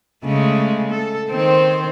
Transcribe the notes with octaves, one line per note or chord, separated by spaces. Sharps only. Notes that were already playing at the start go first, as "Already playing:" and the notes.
C#3 G#3 A3
A4
D#3 C4 C5